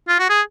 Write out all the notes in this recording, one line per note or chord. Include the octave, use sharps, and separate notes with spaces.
F4
F#4
G#4